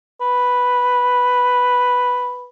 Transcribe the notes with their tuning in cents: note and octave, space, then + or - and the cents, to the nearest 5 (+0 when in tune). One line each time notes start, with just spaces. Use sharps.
B4 +0